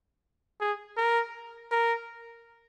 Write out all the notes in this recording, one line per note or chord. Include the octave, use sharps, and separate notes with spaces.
G#4
A#4
A#4